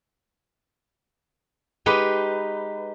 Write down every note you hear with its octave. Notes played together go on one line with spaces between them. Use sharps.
G#3 D#4 G4 B4